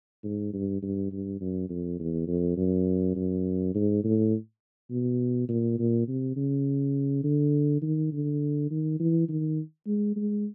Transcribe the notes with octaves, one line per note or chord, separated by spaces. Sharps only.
G#2
G2
G2
G2
F#2
F2
E2
F2
F#2
F#2
G#2
A2
B2
A#2
A#2
C3
C#3
D3
D#3
D3
D#3
E3
D#3
G#3
G#3